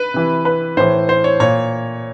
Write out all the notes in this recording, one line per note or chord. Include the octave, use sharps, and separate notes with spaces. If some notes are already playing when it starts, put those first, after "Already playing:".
Already playing: B4
C3 E3
B4
A2 E3 C5
C5
C#5
A#2 C#5